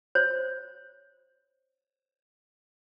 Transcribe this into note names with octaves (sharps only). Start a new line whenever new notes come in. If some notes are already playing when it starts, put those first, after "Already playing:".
C5 C#5